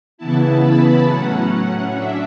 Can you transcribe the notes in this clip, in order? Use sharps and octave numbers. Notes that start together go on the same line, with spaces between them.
C#3 E3 B3 E4 A5
B5
A2 F#3 C#4 F#5
D4 E5